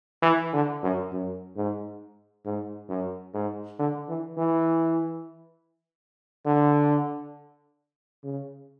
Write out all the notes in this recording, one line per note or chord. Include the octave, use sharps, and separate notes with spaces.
E3
D3
F#2
F#2
G#2
G#2
F#2
G#2
D3
E3
E3
D3
C#3